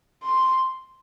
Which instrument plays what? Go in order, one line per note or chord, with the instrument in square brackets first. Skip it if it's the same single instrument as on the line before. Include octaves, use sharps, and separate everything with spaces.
[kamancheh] C6